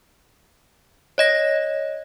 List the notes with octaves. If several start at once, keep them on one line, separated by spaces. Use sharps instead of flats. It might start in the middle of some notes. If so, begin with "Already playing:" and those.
C#5 D#5 A#6